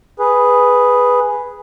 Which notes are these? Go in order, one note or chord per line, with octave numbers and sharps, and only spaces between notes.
G#4 B4